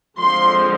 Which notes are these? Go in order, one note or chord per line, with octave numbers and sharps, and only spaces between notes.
D3 F3 G#3 C4 C6